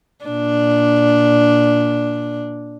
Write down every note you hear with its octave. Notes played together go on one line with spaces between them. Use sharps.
A#2 D4